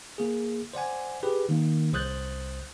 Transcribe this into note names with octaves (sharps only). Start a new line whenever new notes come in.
A#3 G#4
C5 D5 F#5 G#5
G4 G#4 B4
D#3 A#3
C2 C5 D#6 F#6 G6 A6